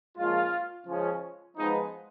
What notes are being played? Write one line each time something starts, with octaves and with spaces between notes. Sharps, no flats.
A#2 F3 G#3 C#4 F4
C#3 F3 G#3 C#4
F3 G#3 B3 D#4